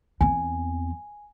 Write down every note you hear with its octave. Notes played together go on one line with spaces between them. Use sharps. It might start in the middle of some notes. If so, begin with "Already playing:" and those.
E2 C4 G#5